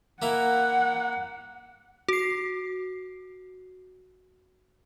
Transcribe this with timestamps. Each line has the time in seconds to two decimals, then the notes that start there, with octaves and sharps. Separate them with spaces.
0.22 A#3 E4 A#4 F#5
2.09 F#4 C7